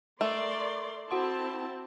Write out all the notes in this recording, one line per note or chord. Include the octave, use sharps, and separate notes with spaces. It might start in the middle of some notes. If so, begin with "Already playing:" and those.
A3 A#4 D5 C6
C4 E4 F#4 F#5 A5 C6